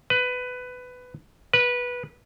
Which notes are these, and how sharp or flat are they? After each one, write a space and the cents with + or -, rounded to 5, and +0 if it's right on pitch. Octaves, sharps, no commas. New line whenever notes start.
B4 +15
B4 -15